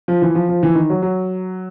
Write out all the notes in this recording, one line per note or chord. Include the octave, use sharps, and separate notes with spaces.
F3
E3
F3
F3
E3
D#3
F#3
F#3